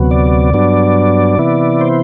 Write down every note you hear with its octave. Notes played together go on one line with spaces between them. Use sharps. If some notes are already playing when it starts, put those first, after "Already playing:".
Already playing: D2 C3 F#3 B3
D5
G2 F#3 B3 D4
C3 E3 B3 E4
C5